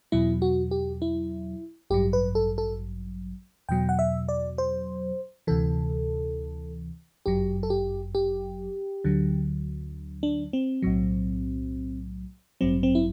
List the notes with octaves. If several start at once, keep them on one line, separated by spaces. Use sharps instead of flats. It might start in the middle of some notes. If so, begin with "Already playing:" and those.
E2 B2 F#3 E4
F#4
G4
E4
A1 G2 F#3 G4
B4
A4
A4
E2 B2 F#3 G5
F#5
E5
D5
C5
D2 C3 E3 A4
G1 F#2 F#3 G4
A4
G4
G4
D2 D3 F#3
D4
C4
B1 A2 F#3
A1 G2 F#3 C4
C4
E4